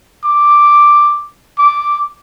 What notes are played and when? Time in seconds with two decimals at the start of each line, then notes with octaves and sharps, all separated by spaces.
0.24 D6
1.58 D6